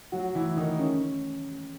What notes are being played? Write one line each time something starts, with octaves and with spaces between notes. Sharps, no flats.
F#3 F#4
E3 E4
D#3 D#4
C#3 C#4